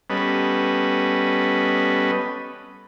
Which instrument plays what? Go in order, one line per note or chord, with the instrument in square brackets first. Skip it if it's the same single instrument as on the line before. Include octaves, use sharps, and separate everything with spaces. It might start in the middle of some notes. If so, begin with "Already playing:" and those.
[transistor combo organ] G3 B3 C#4 A4 B4 D#5